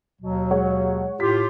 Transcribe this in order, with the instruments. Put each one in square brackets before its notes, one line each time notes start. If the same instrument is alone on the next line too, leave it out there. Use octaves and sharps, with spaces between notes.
[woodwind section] D#2 B2 F#3
[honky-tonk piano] G#3 C#5 F#5
[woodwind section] A2 F4 G4 [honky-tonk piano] B6